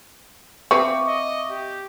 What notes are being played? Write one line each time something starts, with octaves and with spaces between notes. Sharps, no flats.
C4 B4 E5 F5 C#6 D6
D#5
G4